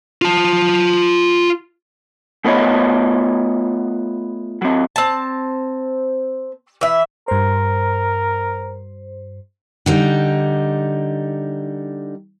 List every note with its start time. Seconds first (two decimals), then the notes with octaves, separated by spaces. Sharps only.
0.22 F4 A5
2.44 A3 B3 F4 B4 C#5 D#5
4.62 F#3 C4
4.96 C4 A5
6.81 E3 E5
7.28 G2 A#4 C5
9.86 D3 G3 D#4